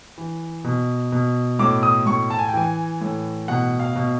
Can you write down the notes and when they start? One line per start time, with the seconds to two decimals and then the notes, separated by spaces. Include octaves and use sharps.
0.18 E3
0.64 B2
1.12 B2
1.59 A2 D6
1.83 D#6
2.06 A2 C#6
2.30 A5
2.39 G#5
2.48 G5
2.54 E3 G#5
3.01 A2
3.48 B2 F#5
3.80 F5
3.95 B2